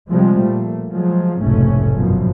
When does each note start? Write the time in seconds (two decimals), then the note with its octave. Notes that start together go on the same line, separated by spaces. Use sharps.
0.10 C3 F3 G3 G#3
0.42 A#2 A3
0.90 F3 F#3 G#3
1.42 F1 B1 G#2 A3 C#4
1.97 G1 F#2 B2 F3